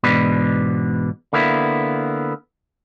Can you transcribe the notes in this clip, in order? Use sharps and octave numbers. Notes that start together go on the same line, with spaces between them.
E2 G#2 B2 D4 B4
D3 A#3 B3 E4